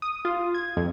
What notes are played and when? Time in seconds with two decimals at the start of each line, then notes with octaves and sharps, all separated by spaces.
0.02 D#6
0.25 F4
0.54 G#6
0.77 F2